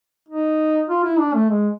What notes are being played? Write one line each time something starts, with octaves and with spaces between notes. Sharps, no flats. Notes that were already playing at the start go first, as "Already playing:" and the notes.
D#4
F4
E4
D4
A3
G#3